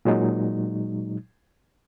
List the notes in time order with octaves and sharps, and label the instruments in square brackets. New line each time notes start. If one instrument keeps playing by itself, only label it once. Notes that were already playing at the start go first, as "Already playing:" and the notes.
[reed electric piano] A#2 F#3 G#3 D#4